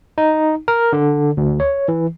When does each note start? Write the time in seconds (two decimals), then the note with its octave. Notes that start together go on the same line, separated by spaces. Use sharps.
0.18 D#4
0.68 A#4
0.93 D3
1.37 D2
1.60 C#5
1.88 E3